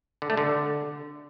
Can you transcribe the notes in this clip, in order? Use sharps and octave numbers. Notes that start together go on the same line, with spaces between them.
D3
A3
D3